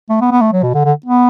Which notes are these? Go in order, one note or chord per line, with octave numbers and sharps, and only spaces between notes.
A3
B3
B3
A3
F#3
B2
D3
D3
B3